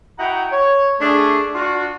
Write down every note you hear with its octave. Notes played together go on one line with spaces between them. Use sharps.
E4 F#4 D#5 F#5 G5 A#5
C#5
A3 D4 G#4
D4 F4 F#4